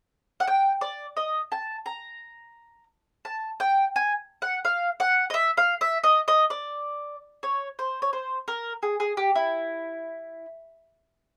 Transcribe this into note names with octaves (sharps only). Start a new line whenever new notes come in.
F#5
G5
D5
D#5
A5
A#5
A5
G5
G#5
F#5
F5
F#5
D#5
E5
F5
E5
D#5
D#5
D5
C#5
C5
C#5
C5
A#4
G#4
G#4
G4
E4